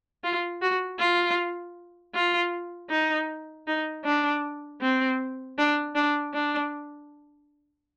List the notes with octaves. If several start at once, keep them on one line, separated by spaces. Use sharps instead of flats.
F4
F#4
F4
F4
D#4
D#4
D4
C4
D4
D4
D4